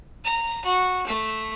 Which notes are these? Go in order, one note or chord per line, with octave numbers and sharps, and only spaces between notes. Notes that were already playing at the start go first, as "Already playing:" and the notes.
A#5
F#4
A3